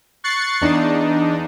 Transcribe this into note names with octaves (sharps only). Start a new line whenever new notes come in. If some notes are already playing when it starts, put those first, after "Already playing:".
C#6 F#6 A6 C7 C#7
E2 D4 D#4